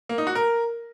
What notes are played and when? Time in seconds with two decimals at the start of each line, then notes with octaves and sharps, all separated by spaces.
0.09 A#3
0.18 D#4
0.27 F#4
0.35 A#4